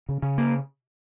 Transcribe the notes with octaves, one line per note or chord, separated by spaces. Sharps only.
C#3
C#3
A#3